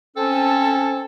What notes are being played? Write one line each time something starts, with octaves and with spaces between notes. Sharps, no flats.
C4 C#4 A4